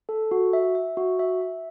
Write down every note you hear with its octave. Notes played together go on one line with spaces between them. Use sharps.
A4
F#4
E5
E5
F#4
E5
E5